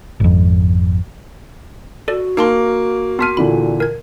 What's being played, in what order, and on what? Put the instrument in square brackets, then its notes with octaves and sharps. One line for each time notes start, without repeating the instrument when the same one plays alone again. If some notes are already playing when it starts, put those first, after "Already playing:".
[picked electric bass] G#1 F2
[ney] F#4 [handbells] A4 D5
[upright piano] A#3 [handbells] D#4 A5 C6
[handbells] B3 A5 F6 [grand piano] C6 B6 D#7
[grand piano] A#2 D3 E3 [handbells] B5
[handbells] A#4 G#6